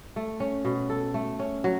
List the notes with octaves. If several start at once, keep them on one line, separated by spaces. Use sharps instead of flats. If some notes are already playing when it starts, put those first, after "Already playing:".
A3
C#4
B2
A4
A3
C#4
F#3